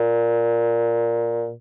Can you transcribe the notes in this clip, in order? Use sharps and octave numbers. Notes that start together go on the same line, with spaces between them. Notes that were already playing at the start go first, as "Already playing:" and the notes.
Already playing: A#2